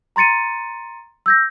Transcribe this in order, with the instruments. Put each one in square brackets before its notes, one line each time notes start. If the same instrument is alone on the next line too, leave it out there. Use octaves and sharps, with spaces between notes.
[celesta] A#5 C6 A6 C#7 D#7
E6 G6 A#6